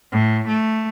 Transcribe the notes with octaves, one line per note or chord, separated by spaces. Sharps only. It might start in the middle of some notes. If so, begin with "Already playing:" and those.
A2
A3